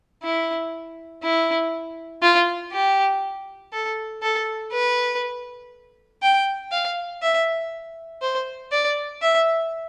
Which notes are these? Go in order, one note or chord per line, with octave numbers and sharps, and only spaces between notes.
E4
E4
F4
G4
A4
A4
B4
G5
F5
E5
C5
D5
E5